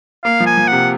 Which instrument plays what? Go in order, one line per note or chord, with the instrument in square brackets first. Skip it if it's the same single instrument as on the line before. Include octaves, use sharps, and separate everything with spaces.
[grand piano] A#3 [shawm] F5
[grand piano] F3
[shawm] G#5
[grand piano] F3
[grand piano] C3 [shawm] F#5